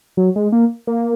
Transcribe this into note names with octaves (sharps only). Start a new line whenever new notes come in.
F#3
G#3
A#3
A#3